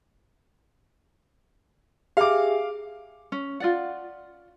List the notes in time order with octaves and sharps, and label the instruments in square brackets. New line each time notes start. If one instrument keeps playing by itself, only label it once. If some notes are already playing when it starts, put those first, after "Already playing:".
[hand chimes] G4 G#4 E5 [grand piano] F5 D6
[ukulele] C#4
F4 D5 F#5